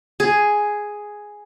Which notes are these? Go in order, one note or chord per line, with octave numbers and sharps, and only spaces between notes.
G#4